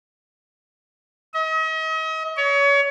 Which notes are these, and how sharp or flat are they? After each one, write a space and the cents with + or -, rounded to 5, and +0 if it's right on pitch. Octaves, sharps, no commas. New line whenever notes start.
D#5 +40
C#5 +25